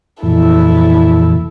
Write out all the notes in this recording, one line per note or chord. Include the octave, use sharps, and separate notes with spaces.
F2 A#2 E3 E4 A4